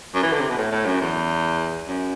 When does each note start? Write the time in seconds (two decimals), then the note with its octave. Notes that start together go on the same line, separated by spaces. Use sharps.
0.15 F#2
0.23 E3
0.32 D3
0.40 C3
0.49 B2
0.58 A2
0.72 A2
0.86 F#2
1.01 E2
1.88 F#2